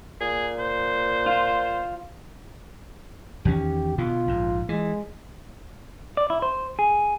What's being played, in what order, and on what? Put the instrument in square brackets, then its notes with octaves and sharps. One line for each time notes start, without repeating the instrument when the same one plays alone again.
[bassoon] A#2 [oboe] G#4
[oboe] C5
[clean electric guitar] F4
[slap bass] E2 D#3 C#4 [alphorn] G4
[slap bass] B2 D3 B3 [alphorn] F4
[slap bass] A#1 G#2
[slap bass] E3 [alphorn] G#3
[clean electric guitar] D5
E4
C5
G#4